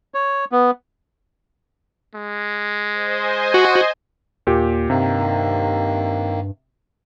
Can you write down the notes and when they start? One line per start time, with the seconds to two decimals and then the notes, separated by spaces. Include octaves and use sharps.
0.14 C#5
0.52 B3
2.15 G#3
2.91 C5 D#5 G#5
3.54 F#4
4.47 D#2 A#2 G4
4.90 G2 C3 D#3 A#3